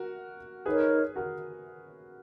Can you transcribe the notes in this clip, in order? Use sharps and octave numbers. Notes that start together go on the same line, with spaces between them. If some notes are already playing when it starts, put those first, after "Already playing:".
Already playing: F#4 A#4
D#4 G#4 A#4 B4 C#5
F#4 A#4